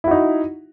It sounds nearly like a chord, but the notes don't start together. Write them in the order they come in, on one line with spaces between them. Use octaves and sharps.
E4 F#4 D#4